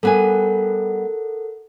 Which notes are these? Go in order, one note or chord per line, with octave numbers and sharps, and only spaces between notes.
G3 B3 A4 A#4 F#5 G#5